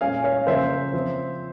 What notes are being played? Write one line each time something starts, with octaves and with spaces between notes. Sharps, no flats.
A#2 G#3 C#4 F5 G#5
C#5 F5
C#3 F3 A#3 C#4 C5 E5
F3 C4